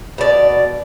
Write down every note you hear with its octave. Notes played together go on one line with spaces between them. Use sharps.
B2 D5